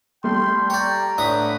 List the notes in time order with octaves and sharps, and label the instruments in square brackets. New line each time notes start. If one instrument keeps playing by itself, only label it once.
[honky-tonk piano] G3 A3 [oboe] G5 [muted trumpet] C6
[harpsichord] C#5 D5 [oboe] G5 [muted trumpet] A#5
[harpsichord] A2 D3 D#6 [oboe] B4